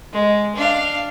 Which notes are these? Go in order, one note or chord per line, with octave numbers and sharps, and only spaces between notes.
G#3
D4 F5